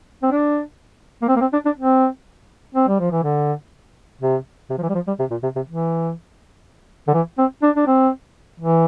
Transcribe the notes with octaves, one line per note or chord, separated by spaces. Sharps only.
C4
D4
A#3
C4
A#3
C4
D4
D4
C4
C4
G3
F3
E3
D3
C3
C3
F3
E3
G3
F3
G3
C3
A#2
C3
C3
E3
D3
E3
C4
D4
D4
C4
E3